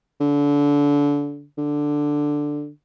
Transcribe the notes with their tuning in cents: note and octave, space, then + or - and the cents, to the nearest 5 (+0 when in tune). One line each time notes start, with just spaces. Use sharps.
D3 -25
D3 +5